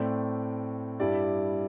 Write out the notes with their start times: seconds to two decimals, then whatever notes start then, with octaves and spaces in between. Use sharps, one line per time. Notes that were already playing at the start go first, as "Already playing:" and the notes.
Already playing: A2 A3 C4 D5
1.00 G2 G3 E4 D5